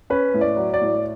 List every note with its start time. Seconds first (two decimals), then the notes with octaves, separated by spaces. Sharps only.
0.10 C#4 B4
0.34 A2
0.41 D5
0.57 F#3
0.74 D5
0.81 A2